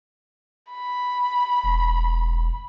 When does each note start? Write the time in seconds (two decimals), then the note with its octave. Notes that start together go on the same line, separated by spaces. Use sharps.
0.73 B5
1.64 E1